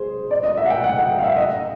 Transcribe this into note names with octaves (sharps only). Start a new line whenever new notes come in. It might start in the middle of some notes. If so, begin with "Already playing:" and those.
Already playing: G#4 C5
D5
D#5
E5
F#5
G5
F#5
F#5
F5
E5
D#5